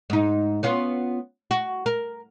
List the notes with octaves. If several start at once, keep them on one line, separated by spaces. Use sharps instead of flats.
G#2 D#4
B3 C#4 F4
F#4
A#4